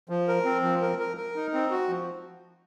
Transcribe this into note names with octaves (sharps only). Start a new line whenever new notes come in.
F3
A#4
C4
F3
A#4
A#4
A#4
D#4
C4
F#4
F3